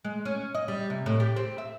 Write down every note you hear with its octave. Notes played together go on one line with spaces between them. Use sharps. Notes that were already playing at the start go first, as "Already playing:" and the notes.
G#3
C#4
D#5
G3
C3
A2
G4
C4
E5